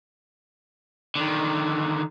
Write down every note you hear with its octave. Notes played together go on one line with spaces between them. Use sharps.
D3 D#3